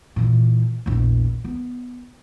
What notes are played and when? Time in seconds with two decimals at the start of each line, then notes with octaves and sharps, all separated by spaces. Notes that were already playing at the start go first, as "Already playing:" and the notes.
0.16 A#2 E3
0.86 A#1 E2
1.44 B3